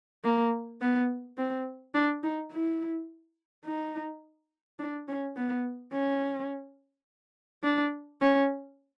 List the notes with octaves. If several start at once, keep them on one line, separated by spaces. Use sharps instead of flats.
A#3
B3
C4
D4
D#4
E4
D#4
D4
C#4
B3
C#4
D4
C#4